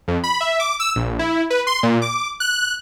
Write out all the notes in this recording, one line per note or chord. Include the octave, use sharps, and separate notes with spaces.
F2
B5
E5
D6
E6
A#1
E4
B4
C6
A#2
D6
F#6